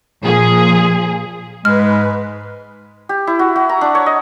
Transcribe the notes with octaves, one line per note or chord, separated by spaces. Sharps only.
A#2 F3 G#4
G#2 G#3 B4 F6
G4
E4
F#4
F#4
A#5
D4
C#5
D#5